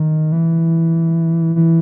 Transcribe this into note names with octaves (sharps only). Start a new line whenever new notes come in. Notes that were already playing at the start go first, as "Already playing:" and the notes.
Already playing: D#3
E3
E3